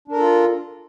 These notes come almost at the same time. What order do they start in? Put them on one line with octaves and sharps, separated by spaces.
D4 A#4 A4 F4